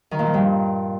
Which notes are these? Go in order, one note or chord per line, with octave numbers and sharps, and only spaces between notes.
D#3
A#2
F3
G2